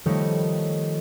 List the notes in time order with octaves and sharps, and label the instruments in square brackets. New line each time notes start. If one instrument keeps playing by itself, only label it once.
[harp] D#3 F3 G3 A3 D#4 C#5